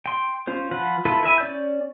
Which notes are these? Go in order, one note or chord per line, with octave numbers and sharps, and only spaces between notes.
G5 C6
C#4 F4 C5
F3 F4 B4 F#5
E4 F4 A4 B4
E4 B4 E5 G#5
C#4 D5 G6